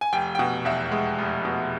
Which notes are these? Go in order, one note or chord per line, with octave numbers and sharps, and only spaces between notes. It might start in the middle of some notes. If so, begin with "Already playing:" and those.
G#5
F1 G5
G5
B2 F#5
E2 E5
G#3
F1
B2